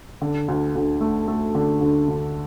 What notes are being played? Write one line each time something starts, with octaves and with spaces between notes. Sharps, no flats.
D3
D2
D2
A3
A3
D3
D2
D2